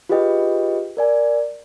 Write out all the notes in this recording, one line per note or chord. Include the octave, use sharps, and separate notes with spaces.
F4 G4 G#4 B4 D#5 G5
A#4 D5 G#5